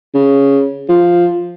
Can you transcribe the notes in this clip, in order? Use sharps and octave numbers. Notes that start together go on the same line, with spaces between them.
C#3
F3